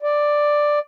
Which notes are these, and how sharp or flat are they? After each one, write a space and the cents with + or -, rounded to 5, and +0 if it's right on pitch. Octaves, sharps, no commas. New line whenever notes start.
D5 +5